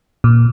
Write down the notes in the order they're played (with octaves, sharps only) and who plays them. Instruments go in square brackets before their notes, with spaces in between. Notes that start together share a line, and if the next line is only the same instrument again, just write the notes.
[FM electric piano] A#2